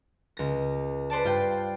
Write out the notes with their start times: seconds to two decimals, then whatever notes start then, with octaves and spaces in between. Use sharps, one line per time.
0.37 C#2 A#6
1.10 B4 C5 D5 A5
1.24 G2 F4 G5